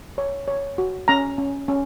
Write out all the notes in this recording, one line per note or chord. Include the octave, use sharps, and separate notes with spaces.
C#5
C#5
F#4
C#4 A#5
C#4
C#4